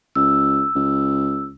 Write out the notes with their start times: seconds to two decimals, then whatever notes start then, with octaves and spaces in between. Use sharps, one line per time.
0.15 C#2 E6
0.75 C#2